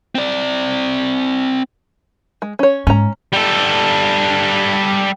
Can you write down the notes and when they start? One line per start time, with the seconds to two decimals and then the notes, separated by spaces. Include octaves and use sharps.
0.15 C4 D5
2.42 G#3
2.59 C#4 C#5
2.87 G#2 C#4 A#5
3.33 G3 A4